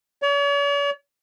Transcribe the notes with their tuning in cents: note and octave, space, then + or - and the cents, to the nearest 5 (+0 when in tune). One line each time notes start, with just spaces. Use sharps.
C#5 +45